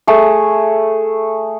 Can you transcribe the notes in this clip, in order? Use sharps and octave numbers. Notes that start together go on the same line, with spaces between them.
A3 G#4